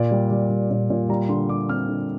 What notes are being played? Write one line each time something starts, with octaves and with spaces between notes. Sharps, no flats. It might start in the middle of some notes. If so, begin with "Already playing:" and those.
Already playing: A#2 D5
G3
G3
G3
A#2
A#2
G3 A#5
D3 C6
G3 D6
C4 F6
D3